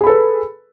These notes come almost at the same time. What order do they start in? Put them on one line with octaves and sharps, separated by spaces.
G#4 B5 A4 B4